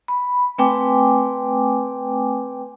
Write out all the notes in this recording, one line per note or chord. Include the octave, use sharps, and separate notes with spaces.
B5
A3 C4 B4 G5 G#5 D6